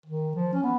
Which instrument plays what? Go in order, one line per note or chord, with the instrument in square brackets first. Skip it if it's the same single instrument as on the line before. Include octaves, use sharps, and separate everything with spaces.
[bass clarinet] D#3
F3
C#4
B3